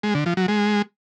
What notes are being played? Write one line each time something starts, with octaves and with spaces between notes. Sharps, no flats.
G#3
D3
F3
F#3
G#3